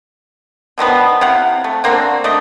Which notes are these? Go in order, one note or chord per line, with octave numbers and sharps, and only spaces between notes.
D3 D#3 F3 B3
C3 E4 F5 F#5
A3
D3 A#3 C4 F#4
A3 D4 D#5